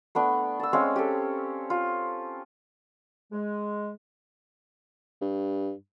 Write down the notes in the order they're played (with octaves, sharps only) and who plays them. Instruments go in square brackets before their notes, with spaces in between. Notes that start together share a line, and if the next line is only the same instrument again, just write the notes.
[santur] A3 B3 D4
A5 E6
G#3 C4 C#4 F5
G4 A4
F4
[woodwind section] G#3
[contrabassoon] G2